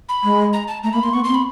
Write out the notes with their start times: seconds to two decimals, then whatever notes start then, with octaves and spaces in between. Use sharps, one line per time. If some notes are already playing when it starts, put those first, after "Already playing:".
0.09 B5
0.24 G#3
0.53 A#5
0.68 A5
0.83 A3 A#5
0.93 A#3 B5
1.03 A#3 C6
1.13 B3 C#6
1.24 C6
1.29 C4
1.34 B5